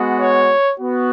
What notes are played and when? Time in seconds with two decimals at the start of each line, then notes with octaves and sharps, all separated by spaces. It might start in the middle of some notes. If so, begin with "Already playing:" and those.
Already playing: G#3 B3 F#4
0.20 C#5
0.80 B3 F#4